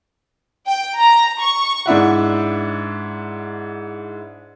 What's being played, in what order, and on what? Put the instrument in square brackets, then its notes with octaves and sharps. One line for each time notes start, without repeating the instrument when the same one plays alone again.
[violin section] G5
A#5
C#6
[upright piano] G#2 D4 E4 F#5